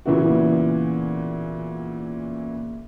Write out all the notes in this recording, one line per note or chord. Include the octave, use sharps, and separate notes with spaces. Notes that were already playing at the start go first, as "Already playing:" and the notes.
A#2 C#3 E3 B3 E4 F#4